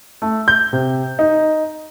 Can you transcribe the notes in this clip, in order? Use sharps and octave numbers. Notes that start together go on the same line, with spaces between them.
A3
G6
C3
D#4